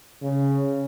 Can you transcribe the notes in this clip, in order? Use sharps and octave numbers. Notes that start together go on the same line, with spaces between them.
C#3